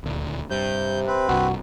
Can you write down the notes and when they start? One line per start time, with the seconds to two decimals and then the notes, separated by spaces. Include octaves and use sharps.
0.04 D#1 D2
0.50 G2 C3 G6
1.07 C4 B4
1.29 C2 G2 F#4